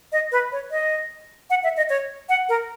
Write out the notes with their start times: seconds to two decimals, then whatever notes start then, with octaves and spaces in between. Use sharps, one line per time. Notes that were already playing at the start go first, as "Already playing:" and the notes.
0.12 D#5
0.32 B4
0.52 C#5
0.71 D#5
1.50 F#5
1.63 E5
1.77 D#5
1.90 C#5
2.29 F#5
2.49 A#4